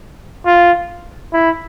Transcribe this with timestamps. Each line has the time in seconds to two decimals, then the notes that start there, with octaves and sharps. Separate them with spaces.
0.46 F4
1.33 E4